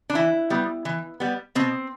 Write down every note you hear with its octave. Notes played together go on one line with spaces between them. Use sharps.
D4
E3 E4
G3 B3
E3
G3 B3
B2 C4